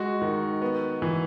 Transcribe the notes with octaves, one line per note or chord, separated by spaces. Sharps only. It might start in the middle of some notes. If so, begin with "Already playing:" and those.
Already playing: G#3 F#4
D#3
B3
E3